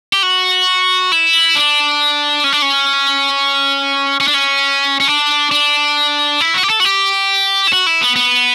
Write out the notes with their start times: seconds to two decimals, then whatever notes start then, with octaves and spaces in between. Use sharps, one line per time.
0.13 G4
0.23 F#4
1.12 E4
1.55 D4
2.44 C#4
2.52 D4
2.62 C#4
4.20 C#4
4.28 D4
4.34 C#4
5.00 C#4
5.08 D4
5.51 D4
6.41 E4
6.54 F#4
6.63 G4
6.70 A4
6.80 F#4
6.85 G4
7.67 E4
7.73 F#4
7.86 E4
8.01 B3
8.16 B3